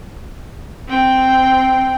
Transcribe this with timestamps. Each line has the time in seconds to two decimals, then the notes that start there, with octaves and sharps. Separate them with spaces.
0.88 C4 G5